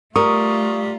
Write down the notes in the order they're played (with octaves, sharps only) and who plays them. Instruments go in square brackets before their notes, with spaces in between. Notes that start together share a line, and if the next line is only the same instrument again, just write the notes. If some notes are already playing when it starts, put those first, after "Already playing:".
[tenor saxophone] G3 [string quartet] A3 F4 [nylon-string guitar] A#4 [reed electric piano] C#6 D#6